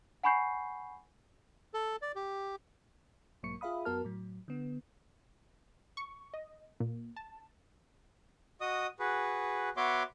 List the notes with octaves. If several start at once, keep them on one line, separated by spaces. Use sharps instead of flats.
F#5 G#5 B5 C#6 G6 C7
A4
D5
G4
B1 G#2 F#3 A#3 C#6 C#7
F4 G#4 E5 F5 B5 D#6
F#2 B3 F#4 A#4 A5 F6
A2 F#3
D3 B3
C#6
D#5
A#2
A5
F#4 D#5 D#6
F#4 G#4 B4
B3 F#4 C#5 E5 C6 D6